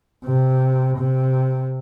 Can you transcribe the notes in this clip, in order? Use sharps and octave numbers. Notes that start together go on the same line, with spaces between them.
C3
C3